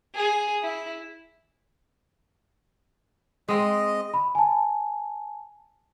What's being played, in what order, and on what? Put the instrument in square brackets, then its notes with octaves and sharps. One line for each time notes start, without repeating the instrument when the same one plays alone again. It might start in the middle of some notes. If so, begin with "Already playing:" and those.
[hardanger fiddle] G#4
E4
[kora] G#3 C4 [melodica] D#5
[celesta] B5
G#5 A5